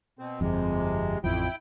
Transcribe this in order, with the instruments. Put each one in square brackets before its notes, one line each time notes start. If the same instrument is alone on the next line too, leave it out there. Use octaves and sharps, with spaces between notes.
[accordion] B2 C4
[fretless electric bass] G1 F2 [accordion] C3 G#3
[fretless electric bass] A1 F2 F3 [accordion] E4 G5